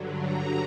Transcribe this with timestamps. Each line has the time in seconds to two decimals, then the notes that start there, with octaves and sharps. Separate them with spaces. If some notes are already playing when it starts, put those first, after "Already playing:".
Already playing: G2 D3 F#3
0.20 A#5